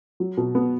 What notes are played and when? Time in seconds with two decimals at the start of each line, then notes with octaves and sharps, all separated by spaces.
0.20 F#3
0.37 B2
0.55 B3